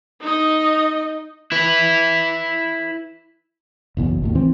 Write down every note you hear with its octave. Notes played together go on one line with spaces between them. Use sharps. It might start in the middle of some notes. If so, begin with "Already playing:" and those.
D#4 D#5
E4 B4
F#1 B1 E2
G#1 D#2 A2
E3 C4